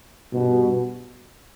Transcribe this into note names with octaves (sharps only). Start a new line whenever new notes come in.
G2 B2